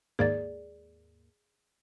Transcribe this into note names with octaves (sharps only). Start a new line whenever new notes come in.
D#2 G#2 A#3 G#4 D5 A6